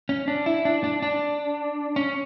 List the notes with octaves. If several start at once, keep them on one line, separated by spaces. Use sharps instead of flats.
C#4
D4
E4
D4
D4
D4
C#4